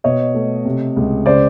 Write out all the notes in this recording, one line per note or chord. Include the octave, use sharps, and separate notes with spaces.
B2 C#5 D#5
A3
C3
C#2
C#3 C5 D5